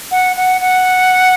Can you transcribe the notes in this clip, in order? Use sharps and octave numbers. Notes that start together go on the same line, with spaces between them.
F#5
F#5
F#5